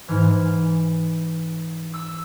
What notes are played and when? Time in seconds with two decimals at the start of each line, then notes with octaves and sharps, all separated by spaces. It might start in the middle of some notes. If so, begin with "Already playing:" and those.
0.08 G#2 E3 F6
1.94 E6